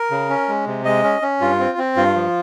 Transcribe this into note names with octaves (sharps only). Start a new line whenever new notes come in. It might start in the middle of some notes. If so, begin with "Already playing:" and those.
Already playing: A#4
C#3
C#4
G#3
C3
G#3 D#5
C#4
C#4
G2 F4
C4
C4
G2 F4
F3